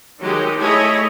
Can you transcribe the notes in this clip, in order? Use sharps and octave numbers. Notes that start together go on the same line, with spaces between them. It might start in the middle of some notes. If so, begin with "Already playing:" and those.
D#3 F#3 G#3 G4
A3 E4 G#4 C#5 D#5